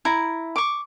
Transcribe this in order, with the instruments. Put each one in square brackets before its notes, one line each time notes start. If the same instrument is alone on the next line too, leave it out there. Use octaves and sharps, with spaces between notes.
[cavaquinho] E4 A#5
C#6 D6